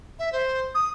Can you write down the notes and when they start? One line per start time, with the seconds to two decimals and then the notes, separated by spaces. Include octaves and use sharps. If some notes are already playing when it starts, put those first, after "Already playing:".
0.19 E5
0.33 C5
0.75 D#6